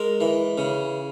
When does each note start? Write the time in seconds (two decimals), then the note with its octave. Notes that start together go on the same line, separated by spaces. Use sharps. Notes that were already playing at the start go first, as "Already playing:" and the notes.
Already playing: G#3 A#4
0.21 E3
0.58 C#3